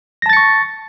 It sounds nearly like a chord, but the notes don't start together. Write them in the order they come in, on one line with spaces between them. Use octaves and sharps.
A#6 A5 A6 C#7 C#6